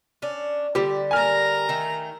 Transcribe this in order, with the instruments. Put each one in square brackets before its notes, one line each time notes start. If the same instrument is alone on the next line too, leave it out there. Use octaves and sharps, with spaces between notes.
[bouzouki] C#4 D4
[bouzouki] D3 G3 [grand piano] G4
[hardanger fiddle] A#4 A#5 [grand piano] G#5 F6
[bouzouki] D#3 A3